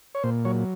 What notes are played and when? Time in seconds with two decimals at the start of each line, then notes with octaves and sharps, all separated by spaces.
0.15 C#5
0.23 A#2 C5
0.45 F#3 C#5